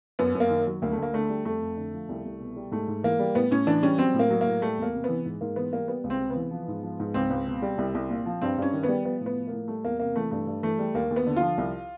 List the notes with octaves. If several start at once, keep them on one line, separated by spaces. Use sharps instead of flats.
F#2 B3
F#2
A#3
D#3
F#3
D2 A#3
A3
D2 A#3
D3 A3
G3
F2 A3
F2
D3
F3
C2
C2
B2
G3
G#2 A3
G#2
E3 A#3
G3
A2 B3
A2 C#4
E3 D4
G3 C#4
F#3 C4
A2
A#3
F#3
A#3
A2
G3 A3
E2 A#3
C3
E3 B3
G#2
G#2 A#3
E3 B3
G3 A#3
G3 B3
C#2
C4
C3
B3
E3
F3
G#2
F3
G#2
C#2 C4
C#2
B2
G3
C2
C2
A#2
F3
G2 C4
G2 C#4
D#3
B3
G3
F3 B3
A2
B3
F3
A2 A#3
G3 A3
E2 A#3
C3 A#3
E3 A3
G2 A3
G2
E3 A3
G3
D#2 A#3
D#2
B3
D3
F4
F3
C2